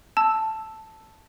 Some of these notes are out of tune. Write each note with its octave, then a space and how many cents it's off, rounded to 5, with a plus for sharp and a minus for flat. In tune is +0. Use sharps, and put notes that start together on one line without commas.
A5 +0 E6 +0